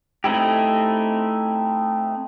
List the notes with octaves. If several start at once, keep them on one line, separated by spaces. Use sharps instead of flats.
A3 C4 D#4 E4 G4